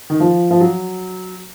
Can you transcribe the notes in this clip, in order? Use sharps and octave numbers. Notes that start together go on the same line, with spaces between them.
D#3
F3
F3
F#3